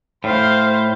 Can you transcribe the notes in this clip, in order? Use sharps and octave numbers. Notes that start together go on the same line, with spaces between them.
A2 C5 F5